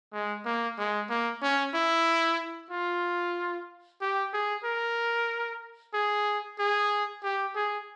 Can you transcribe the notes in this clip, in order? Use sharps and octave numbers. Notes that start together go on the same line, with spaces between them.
G#3
A#3
G#3
A#3
C#4
E4
F4
G4
G#4
A#4
G#4
G#4
G4
G#4